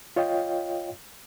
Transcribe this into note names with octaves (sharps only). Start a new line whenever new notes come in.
F4 C#5 D#5 F5 G5